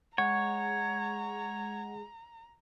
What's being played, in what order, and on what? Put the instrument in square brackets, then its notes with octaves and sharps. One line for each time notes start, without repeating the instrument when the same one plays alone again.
[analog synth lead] G#3 [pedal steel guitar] C#5 [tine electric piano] F#5 [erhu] A#5